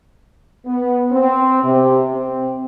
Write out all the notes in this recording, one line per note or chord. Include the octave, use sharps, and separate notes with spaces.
B3
C4
C3
C4